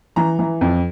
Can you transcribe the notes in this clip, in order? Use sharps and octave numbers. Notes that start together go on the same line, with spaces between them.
E3 A#5
E3
F2